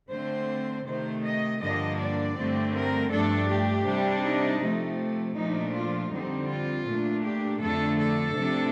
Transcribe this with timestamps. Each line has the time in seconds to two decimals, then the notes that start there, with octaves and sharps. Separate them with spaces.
0.10 D3 A3 C4 C5
0.86 C3 D#3 A3 C5
1.23 D#5
1.60 G2 D3 F3 A#3 D4 D#5
1.98 D5
2.36 G2 D3 A3 C4
2.73 A#4
3.11 G2 F3 A3 D4 A4
3.48 G4
3.85 C3 G3 D4
4.23 D#4
4.60 C3 F3 A3
5.35 A#2 F3 A3 D4 D#4
5.73 F4
6.10 F2 D3 G3 C4 D#4
6.48 F4
6.86 A#2 A3 D4
7.23 G4
7.60 F2 D3 A3 D4 A4
7.98 A4
8.36 C3 F3 A3 D4